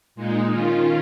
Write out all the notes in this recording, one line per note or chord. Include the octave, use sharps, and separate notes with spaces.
A#2 G#3 D#4
D#3 C#4 F4